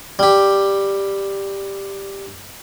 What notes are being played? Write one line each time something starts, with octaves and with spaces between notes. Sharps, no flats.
G3 G4